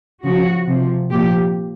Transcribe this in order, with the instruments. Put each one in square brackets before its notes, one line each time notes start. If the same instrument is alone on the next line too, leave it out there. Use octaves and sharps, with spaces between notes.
[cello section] C#3 F3 F#4
C3 F3
A#2 F3 G4